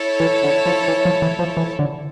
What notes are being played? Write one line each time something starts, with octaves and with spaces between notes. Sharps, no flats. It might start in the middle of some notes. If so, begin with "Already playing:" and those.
Already playing: E4 A4 C#5
E3
D3
F3
E3
F3
E3
F3
E3
D3